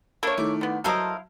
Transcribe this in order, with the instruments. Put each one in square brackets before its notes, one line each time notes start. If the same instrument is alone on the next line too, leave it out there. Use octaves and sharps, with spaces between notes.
[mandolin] A#3 D4 E4 [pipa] A4 C#5
[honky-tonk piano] D#3 A3 E4 [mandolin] D6
[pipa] D3 B3
[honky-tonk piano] F#3 A5 [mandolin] E4 C5 F5 [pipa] A4 A#4 D#5